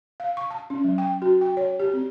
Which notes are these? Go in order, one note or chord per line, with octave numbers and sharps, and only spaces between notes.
F5
C#6
A5
C#4
F#3
G5
F#4
G5
C#5
G4
C4